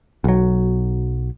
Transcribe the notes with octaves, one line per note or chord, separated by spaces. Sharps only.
B1 F#3